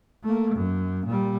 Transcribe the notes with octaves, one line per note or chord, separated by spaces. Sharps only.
A3 A#3
F#2
A#2 G3